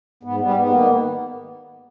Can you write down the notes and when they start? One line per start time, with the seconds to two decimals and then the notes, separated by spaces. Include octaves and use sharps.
0.23 G#2 B3
0.40 G3 B3
0.55 G#2 B3
0.72 D#3 A#3